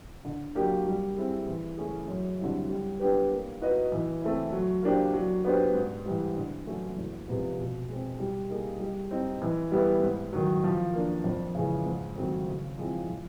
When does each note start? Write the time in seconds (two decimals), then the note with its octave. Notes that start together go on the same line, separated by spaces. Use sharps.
0.25 D3
0.55 F#3 A#3 D4 G4
0.87 G3
1.17 C4 E4 G#4
1.48 E3
1.77 A3 C#4 E4 G#4
2.08 F#2
2.39 D3 G3 C4 E4
2.70 G3
2.99 B3 D4 G4 B4
3.30 A#3
3.61 D#4 F#4 B4 D#5
3.92 E3
4.22 A3 C4 E4
4.52 F#3
4.83 A#3 D4 G4 C5
5.13 F#3
5.45 B3 D4 G4 C5
5.75 G#2
6.06 E3 G3
6.36 D3
6.66 F#3 A3 C#4 F#4
6.96 E2
7.28 C3 F3 G#3 B3
7.58 B2
7.89 G#3 C4
8.20 G3
8.49 A#3 D#4 G#4
8.80 G3
9.11 C4 D#4
9.42 E3
9.72 G3 B3 E4
10.03 G#2
10.33 D#3 F#3
10.64 F3
10.94 A#3 D4
11.24 F2
11.55 C#3 E3 G#3
11.86 G#2
12.16 D#3 F#3 A3 C4
12.47 C#3
12.77 F3 G#3 C4 E4
13.08 F3